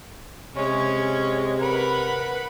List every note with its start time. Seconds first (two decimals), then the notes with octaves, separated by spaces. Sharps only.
0.56 C3 G#3 C#4 C#5
1.61 A#4 B4 F#5 B5